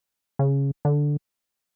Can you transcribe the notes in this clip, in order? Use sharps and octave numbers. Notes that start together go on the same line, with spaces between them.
C#3
D3